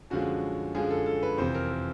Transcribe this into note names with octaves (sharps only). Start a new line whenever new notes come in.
F#2 D3 F3 G#3 F#4
F#2 D3 F3 G#3 G#4
A4
A4
B4
F2 C3 E3 C5
A#4
A#4